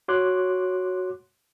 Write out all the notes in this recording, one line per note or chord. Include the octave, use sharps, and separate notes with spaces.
F#4 C#5 C6 D6 F#6